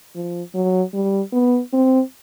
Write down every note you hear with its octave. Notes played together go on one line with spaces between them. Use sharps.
F3
F#3
G3
B3
C4